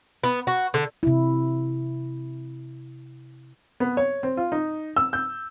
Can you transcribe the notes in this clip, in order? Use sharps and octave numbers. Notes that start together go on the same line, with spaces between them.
B3
F#4
D3
C3 E4
B3
C#5
C4
F4
D#4
E6
G6